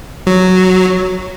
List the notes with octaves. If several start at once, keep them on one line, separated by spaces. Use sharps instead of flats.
F#3